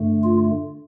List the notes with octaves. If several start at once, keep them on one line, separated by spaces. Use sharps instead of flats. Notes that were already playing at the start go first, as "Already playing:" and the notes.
Already playing: G2 D3 A3
F4